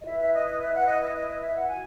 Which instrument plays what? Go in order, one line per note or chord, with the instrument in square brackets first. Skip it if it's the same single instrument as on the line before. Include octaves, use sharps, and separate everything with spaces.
[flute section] D#5
E4 B4 E5
E5
D#5
D#5
E5
F#5
D#5
D#5
D#5
D#5
E5
F#5
F#4 G#5